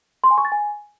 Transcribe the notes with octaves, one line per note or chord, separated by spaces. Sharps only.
C6
G#5
C#6
A6
G#5